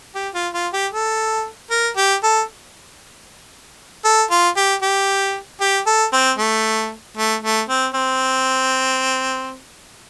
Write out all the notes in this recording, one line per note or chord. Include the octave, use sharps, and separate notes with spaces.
G4
F4
F4
G4
A4
A#4
G4
A4
A4
F4
G4
G4
G4
A4
C4
A3
A3
A3
C4
C4